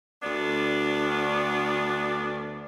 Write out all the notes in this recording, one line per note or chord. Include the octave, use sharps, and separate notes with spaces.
D2 B3 D4 D5